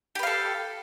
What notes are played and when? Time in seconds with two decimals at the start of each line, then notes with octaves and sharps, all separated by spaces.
0.15 G4
0.19 B4
0.23 F5
0.27 A4